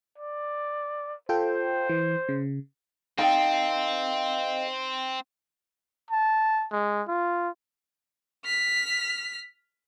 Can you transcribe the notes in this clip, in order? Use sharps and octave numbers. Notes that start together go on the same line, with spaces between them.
D5
F4 A4 C5 G5
E3
C#3
C4 D#4 A4 D#5 F5 G5
A5
G#3
F4
F6 B6